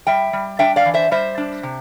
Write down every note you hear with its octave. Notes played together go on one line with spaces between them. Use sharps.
G3 E5 G5
G3
D4 E5 G5
D5 F5
E3
C5 E5
G3 C5 E5
D4
C3